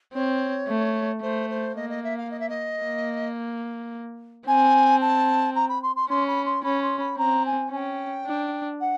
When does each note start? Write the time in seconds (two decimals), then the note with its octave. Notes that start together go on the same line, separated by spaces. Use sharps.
0.14 C4 C#5
0.68 A3
1.22 A3 C5
1.50 C5
1.76 A#3 D#5
1.89 D#5
2.04 E5
2.17 F5
2.31 D#5
2.39 E5
2.49 D#5
2.85 A#3
4.47 C4 G#5
5.01 A5
5.55 A#5
5.69 B5
5.82 C6
5.96 C6
6.09 C#4 C6
6.27 B5
6.45 C6
6.63 C#4 B5
6.82 C6
6.99 B5
7.18 C4 A#5
7.46 G#5
7.71 C#4 G#5
7.76 G5
8.26 D4
8.80 F#5